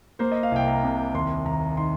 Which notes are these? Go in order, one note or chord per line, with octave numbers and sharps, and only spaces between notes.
A#3 C5
D#5
F5
C2 G5
A#5
C3
D#2 C6
D#2 A#5
D#3 C6